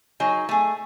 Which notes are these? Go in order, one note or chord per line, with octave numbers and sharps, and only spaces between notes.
F#3 D#4 G#4
A3 G#4